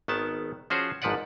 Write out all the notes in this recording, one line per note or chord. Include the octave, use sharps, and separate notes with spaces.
G#1 D#3 B3 A5
F3 C#4 F#4 G#4 C5
G#1 G#2 F3 B4 D5 F#5